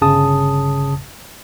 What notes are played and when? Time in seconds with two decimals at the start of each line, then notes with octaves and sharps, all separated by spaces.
0.01 G1 C#3 A5 D#6